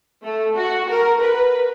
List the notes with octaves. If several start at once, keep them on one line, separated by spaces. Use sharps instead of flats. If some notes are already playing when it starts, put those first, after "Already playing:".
A3
F#4
A#4
B4